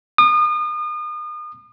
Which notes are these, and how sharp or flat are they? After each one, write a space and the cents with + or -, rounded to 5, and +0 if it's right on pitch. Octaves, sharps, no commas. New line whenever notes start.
D#6 -35